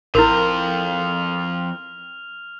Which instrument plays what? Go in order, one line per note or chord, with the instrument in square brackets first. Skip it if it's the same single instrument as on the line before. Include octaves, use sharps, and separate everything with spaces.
[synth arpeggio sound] A1 [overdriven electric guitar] F2 C5 [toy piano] E4 A#4 [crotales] F6 F7